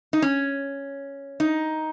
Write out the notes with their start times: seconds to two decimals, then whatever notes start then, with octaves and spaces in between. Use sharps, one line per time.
0.13 D#4
0.22 C#4
1.40 D#4